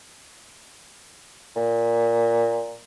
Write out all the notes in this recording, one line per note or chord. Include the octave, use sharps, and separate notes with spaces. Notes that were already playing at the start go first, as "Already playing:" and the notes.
A#2